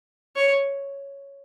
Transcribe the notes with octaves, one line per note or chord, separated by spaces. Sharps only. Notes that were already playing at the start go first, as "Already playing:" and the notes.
C#5